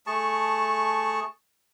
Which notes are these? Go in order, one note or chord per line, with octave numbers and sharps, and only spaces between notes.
A3 G#4 A5 C#6